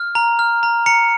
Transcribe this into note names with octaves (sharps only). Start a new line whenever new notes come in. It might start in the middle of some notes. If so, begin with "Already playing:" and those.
Already playing: F6
A#5
F6
A#5
A#5 C#7